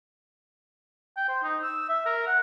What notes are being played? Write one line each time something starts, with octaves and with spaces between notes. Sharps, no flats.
G5
C5
D#4
E6
E5
A#4
F#5